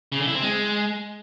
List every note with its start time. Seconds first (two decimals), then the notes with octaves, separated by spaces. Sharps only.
0.12 C#3
0.20 D3
0.27 E4
0.35 C4
0.42 G#3